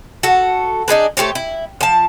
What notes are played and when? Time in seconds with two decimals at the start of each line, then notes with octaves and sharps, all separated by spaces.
0.23 F#4 A4
0.88 D4 D#4 G#4 B4
1.17 A3 G4 C5 C#5
1.35 E4
1.81 F3 A5